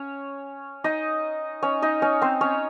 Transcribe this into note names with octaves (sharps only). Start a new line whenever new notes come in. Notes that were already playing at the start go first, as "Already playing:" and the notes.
Already playing: C#4 C#5
D#4 D#5
C#4 C#5
D#4 D#5
C#4 C#5
C4 C5
C#4 C#5